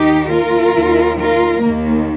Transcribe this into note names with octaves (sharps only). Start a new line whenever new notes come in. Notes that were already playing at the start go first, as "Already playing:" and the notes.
Already playing: D#2 D#3 D#4 G4
F4 A#4
D#2 D#3
F4 A#4
D#2 D#3 A#3